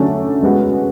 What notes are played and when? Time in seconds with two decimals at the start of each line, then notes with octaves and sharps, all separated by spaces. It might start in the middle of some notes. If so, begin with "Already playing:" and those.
Already playing: D3 F#3 A3 C#4 D4 A4
0.42 G#3 B3 F#4 B4